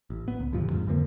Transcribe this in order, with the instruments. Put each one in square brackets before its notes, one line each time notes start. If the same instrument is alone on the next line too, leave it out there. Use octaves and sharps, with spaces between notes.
[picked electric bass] A1
B3
C#2
D#1 D2 G2 F3
F2 G#2
F2 D3 F3 A#3